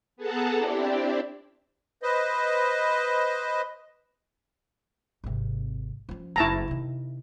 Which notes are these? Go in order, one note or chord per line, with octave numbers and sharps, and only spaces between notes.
B3 G#4 A4 F#5 A5 A#5
C4 D4 E4 G4 D5
B4 C5 D#5
G#1 C3
F3 C#4
F#1 F#2 E4 A5 A#5
C3 D#3